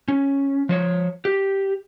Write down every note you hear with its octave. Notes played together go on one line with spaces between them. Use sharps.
C#4
F3 C5 C#5
G4